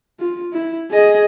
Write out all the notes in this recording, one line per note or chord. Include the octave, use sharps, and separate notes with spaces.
F4
E4
G#4 D#5